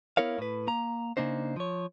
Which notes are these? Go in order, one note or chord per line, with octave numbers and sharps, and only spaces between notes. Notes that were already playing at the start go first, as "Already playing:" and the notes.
B3 E4 A#4 C#5 F5
A2 B4
A#3 A#5
C#3 A#3 D4 D#4 C5
F3 C#5